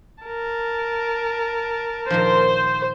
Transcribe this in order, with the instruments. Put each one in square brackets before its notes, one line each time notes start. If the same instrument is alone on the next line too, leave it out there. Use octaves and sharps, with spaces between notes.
[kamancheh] A#4 A5
[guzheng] A#2 D#3 F3 [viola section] C5